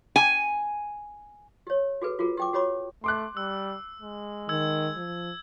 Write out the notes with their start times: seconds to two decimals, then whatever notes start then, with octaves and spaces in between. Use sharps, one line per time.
0.16 G#5
1.67 G4 C#5
2.02 F#4 G#4 A4 B4
2.19 F4 F#4 G#4 A#4
2.37 G4 G5 D6
2.53 F#4 G4 C#5 B5 D6
3.04 A3 C6 D6 F#6
3.37 G3 E6
4.01 G#3
4.49 D#3 E6 G#6
4.96 F3